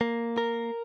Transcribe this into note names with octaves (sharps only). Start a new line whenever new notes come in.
A#3
A#4